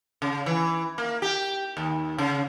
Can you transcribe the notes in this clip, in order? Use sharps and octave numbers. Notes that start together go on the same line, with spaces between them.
C#3
E3
A#3
G4
D#2
C#3